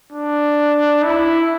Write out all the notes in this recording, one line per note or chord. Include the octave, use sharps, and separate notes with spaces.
D4
E4